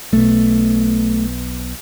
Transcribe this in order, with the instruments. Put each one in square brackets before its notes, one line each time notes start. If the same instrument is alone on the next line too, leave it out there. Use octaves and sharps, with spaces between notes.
[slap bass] B1 B2 A3